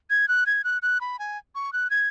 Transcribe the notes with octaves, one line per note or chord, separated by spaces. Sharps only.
G#6
F#6
G#6
F#6
F#6
B5
G#5
C#6
F#6
G#6